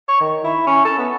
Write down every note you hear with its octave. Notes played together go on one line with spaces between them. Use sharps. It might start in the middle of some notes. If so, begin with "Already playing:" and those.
C#5
D#3
E4
C#4
A4
B3